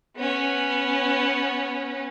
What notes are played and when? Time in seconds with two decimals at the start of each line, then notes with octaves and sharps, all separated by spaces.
0.17 B3 C#4